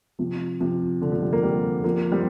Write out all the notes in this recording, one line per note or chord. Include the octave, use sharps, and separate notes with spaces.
C3 F3
C3 F3
D3
F3
G3
A#3
G3 C4
F3 A#3
G3 C4